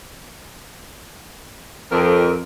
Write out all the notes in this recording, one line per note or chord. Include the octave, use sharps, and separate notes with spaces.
F2 A#4